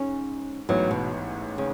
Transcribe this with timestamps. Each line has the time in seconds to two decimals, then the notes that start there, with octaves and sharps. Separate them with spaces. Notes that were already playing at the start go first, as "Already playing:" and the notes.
Already playing: G#2 C#4
0.69 A1 G#2 E3 F#3 B3
0.91 B2
1.58 C#3